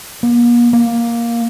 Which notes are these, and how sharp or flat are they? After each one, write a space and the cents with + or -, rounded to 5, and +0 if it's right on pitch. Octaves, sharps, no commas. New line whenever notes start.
A#3 +45
A#3 +10